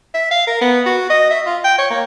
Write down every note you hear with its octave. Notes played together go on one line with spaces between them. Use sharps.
E5
F5
A#4
B3
F#4
D#5
E5
F4
G5
C#5
A#3